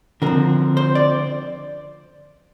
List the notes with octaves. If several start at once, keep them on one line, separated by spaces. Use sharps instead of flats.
D3 F3 C4 A#4
C5
D5